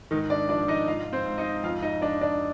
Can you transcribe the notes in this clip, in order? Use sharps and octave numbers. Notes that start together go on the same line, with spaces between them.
G#2 D#3 D#4
D4 D5
F3 D4 D5
D#4 D#5
G#2 F4 F5
C4 C5
G#2
D#4 D#5
F2 F4 F5
D#4 D#5
F2 D4 D5
D4 D5